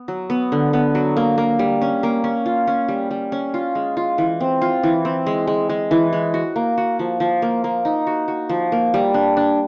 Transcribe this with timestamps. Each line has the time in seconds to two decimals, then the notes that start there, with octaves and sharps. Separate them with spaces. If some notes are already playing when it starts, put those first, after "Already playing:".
Already playing: B3
0.08 F#3
0.30 B3
0.52 D3
0.73 B3
0.95 F#3
1.17 A#3
1.38 A#3
1.59 G3
1.81 C#4
2.03 A#3
2.24 C#4
2.46 F4
2.67 C#4
2.88 G3
3.11 G3
3.32 C#4
3.54 F4
3.75 G#3
3.97 F4
4.18 E3
4.41 C4
4.61 F4
4.83 E3
5.05 C4
5.26 G#3
5.47 G#3
5.69 G#3
5.91 E3
6.13 G#3
6.34 F#4
6.56 A#3
6.78 F#4
6.99 F3
7.20 F3
7.42 A#3
7.64 A#3
7.85 D#4
8.07 F#4
8.28 F#4
8.49 F3
8.72 A#3
8.94 G3
9.14 D4
9.37 D4